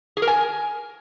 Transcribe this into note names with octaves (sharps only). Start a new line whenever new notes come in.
G#4
A#4
G#5